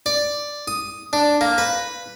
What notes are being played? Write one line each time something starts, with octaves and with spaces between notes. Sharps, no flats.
D5
D#6
D4
A#3
B4